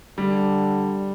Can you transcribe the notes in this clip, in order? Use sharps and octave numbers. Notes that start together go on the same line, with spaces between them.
D3 G3